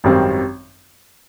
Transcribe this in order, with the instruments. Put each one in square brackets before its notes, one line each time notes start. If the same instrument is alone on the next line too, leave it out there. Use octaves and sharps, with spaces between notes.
[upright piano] G#1 F#2 D#3 G3 C4